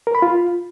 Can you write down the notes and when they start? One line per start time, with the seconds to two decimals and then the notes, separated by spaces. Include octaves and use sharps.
0.07 A#4
0.15 B5
0.22 F4